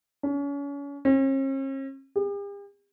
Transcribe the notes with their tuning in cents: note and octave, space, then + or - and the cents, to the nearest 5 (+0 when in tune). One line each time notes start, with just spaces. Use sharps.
C#4 +35
C#4 -45
G4 +45